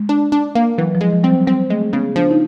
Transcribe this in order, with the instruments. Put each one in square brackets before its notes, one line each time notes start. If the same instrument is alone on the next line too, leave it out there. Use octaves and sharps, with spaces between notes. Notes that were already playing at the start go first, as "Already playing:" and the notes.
Already playing: [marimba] G#3
[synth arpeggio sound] D4
D4
A#3
[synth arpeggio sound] E3 [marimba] F#3
[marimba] F3
[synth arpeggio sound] G#3
[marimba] F3
[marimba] G3 [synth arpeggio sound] C4
[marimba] F#3
[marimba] G3 [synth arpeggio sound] C4
[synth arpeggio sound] G#3 [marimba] A3
[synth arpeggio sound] C#3 [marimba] B3
[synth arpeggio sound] F3 [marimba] D4
[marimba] D#4